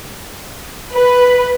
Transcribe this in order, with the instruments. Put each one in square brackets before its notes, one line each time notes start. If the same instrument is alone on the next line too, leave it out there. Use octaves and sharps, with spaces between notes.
[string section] B4